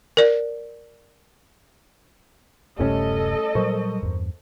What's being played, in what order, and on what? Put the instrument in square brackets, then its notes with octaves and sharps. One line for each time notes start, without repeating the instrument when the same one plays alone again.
[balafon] A#4 D5
[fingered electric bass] D1 F#2 C3 [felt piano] G3 A3 C#4 [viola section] A4 D#5
[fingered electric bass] A#2 F#3 G3 [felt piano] A#4 C5 C#6
[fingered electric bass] E2 G2